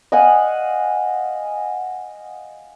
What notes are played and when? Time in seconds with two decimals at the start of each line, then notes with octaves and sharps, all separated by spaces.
0.12 D#5 F5 F#5 G#5